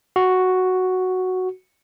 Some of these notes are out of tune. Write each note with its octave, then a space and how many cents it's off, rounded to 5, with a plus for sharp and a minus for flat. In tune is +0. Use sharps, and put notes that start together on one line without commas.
F#4 +0